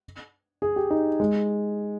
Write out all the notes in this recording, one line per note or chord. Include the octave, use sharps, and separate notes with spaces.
G#4
G4
D#4
G#3